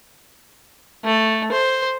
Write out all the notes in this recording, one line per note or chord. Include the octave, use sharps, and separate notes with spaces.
A3
C5